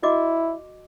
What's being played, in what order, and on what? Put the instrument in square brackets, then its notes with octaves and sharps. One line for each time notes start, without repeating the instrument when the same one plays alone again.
[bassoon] E4 [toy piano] F#4 D#5 D6